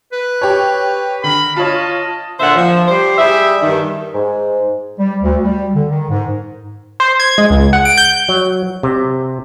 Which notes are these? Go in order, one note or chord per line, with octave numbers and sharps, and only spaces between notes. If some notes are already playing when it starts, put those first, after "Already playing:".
B4
G4 C#5
D3 A#4 B5
F4 C#5 D#5 A5
A#2 D3 C5 E5 F#5
F3
G3 G4 C5
G3 G#4 E5
G2 D#3
G#2
G3
D2
G3
D3
D#3
G#2
C5
G#6
G#3
C#2
F#5
D7
G6
F#3
C3